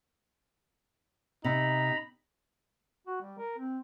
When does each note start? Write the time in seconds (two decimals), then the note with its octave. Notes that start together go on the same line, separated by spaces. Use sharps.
1.44 C3 D#4 A#5 B5
3.07 F#4
3.21 G3
3.38 A#4
3.58 C4